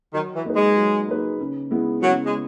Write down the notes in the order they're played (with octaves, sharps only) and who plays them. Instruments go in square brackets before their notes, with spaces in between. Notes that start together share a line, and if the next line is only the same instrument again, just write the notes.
[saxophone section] D#3 [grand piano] F#3
[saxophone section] E3
[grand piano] A#3 D#4 G#4 B4
[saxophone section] G#3
[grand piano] F#3
A#3 D#4 G#4 B4
C#3
G#3 B3 E4
[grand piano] C#3 [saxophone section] F#3
[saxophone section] G#3